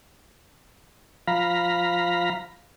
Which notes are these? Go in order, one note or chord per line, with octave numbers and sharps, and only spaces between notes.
F3 F5 A#5 B5